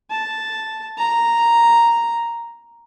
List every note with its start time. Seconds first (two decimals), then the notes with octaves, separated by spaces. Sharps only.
0.10 A5
0.98 A#5